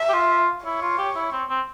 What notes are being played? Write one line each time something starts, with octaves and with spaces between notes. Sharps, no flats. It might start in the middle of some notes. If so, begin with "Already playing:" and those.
Already playing: E5
G4
F4
E4 C#5
F4
G4
E4
C4
C4